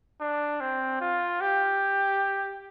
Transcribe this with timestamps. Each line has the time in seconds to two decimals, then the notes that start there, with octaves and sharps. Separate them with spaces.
0.21 D4
0.60 C4
1.01 F4
1.41 G4